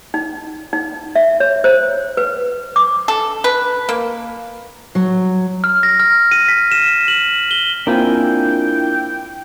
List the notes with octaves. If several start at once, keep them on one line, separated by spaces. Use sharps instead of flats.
D#4
D#4
E5
C#5
C5
B4
D6
A4
B4
A#3
F#3
F6
A#6
F6
D#7
B6
E7
F#7
G7
A#3 C4 D4 E4 F4 A#4 G5 G#5